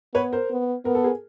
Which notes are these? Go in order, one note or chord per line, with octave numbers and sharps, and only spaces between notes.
B3 B4 C#5
A#4 C5
B3
B3 A#4
A4
G#4 A#4